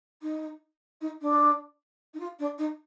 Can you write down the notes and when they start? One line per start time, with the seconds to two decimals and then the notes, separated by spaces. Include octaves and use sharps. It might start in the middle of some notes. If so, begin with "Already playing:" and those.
0.22 D#4
1.01 D#4
1.21 D4
2.14 D#4
2.19 F4
2.39 D4
2.58 D#4